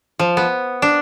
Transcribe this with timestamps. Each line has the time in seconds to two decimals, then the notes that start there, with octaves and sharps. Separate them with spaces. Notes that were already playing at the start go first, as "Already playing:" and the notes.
0.19 F3
0.37 B3
0.82 D4